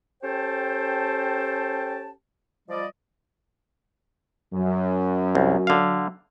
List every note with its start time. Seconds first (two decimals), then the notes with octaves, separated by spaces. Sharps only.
0.23 C#4 G4 A4 C5 G5 A5
2.69 F3 G3 D5 D#5
4.53 F#2 F#3
5.35 C2
5.67 D3 F5